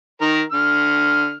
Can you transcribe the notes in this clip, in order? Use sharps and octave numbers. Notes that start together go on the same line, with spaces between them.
D#3 A#4 A#5
D3 F6